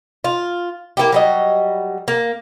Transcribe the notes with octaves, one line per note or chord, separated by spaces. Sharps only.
F4
A#3 B3 E4 G4
F#3 G3 D#5
A#3